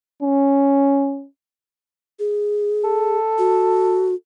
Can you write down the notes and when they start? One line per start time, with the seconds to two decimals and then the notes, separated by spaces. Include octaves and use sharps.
0.22 C#4
2.19 G#4
2.84 A4
3.38 F#4